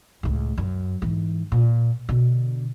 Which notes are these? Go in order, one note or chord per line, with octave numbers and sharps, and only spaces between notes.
C#2 A2
F#2
G#2 E3
A#2
B2 D3